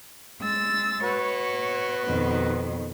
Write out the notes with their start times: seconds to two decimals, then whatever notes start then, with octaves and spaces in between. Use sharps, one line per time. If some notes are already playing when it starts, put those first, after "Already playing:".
0.40 G#3 E6 A6
1.03 F#4 B4 C#5
2.05 F2 B2 D#3